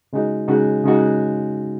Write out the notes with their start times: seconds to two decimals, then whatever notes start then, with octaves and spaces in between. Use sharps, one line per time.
0.13 C#3 G#3 D#4 F#4
0.48 C#3 G#3 D#4 F#4
0.84 C#3 G#3 D#4 F#4